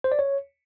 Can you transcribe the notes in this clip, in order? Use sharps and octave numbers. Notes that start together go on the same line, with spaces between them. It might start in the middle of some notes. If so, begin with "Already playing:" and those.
C5
D5
C#5